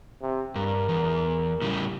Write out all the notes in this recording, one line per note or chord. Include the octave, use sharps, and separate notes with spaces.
C3
G2 A#4
E2
A2 C#3 G3